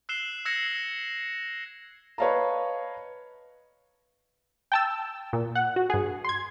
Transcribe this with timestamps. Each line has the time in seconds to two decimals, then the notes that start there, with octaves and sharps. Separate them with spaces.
0.09 E6 F#6 C7 E7 G7
0.45 E6 F#6 G#6 A#6 C#7 E7
2.18 B4 C#5 D#5 F5 A5 A#5
4.72 G5 A5 E6
5.33 A#2
5.55 F#5
5.76 F#4
5.90 G2 G#4
6.24 C6 G#6